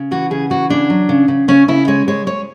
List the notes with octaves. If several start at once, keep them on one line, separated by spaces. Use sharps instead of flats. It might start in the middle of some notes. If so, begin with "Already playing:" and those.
Already playing: C#3
E3 F#4
C#3 G#4
E3 F#4
C#3 D4
F#3
C#3
C#3
C#3 C#4
C#3 E4
G#3 C#5
G#3 C#5
G#3 C#5